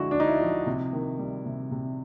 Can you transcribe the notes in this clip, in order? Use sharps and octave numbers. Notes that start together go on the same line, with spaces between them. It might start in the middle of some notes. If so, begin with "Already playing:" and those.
Already playing: D3 F3 G#3 E4 F#4
D3 D4
D#4
E4
F3
C3
D#3
G3
C3
C3